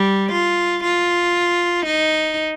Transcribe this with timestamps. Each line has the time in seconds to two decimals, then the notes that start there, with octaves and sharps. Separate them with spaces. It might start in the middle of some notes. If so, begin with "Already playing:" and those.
Already playing: G3
0.32 F4
0.84 F4
1.86 D#4